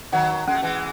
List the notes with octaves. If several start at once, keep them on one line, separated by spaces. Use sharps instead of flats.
D#3 F#3 F#5
G#3 C#4
A3
E3 G#3